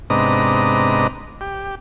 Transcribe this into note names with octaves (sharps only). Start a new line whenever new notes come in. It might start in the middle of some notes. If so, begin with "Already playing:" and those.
G#2 C3 B3 D4 D#5 A#5
G4